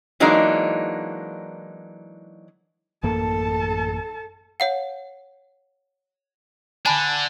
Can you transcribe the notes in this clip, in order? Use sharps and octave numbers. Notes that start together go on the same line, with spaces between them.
E3 F#3 G#3 A#3 D4 D#4
A1 F#2 A#3 A4 A5
C#5 F5 F#5
D3 D4 G#5 A5 B5